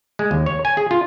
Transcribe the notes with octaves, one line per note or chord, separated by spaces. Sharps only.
G#3
D#2
C#5
G#5
G#4
F4